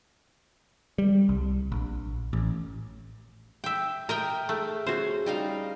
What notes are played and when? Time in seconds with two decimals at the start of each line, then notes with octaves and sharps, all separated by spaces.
0.98 G3
1.29 C2
1.72 A#1
2.33 A1
3.64 E5 G5
4.09 A#4 D#5 E5 G5
4.49 A3 G#4
4.87 C#4 F#4 C5
5.26 G3 D#4 F5